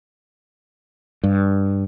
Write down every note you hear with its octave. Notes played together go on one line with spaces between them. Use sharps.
G2